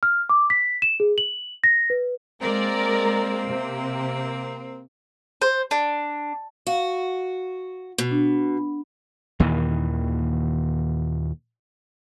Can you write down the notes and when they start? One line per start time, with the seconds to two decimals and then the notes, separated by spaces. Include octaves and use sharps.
0.03 F6
0.30 D6
0.50 B6
0.82 E7
1.00 G#4
1.18 F#7
1.64 A#6
1.90 B4
2.41 G#3 A#3 C4 A#4 D5
3.48 C3
5.42 C5
5.71 D4
6.67 F#4 F5
7.98 B2
8.11 D4
9.40 D#2 A#2 D#3 E3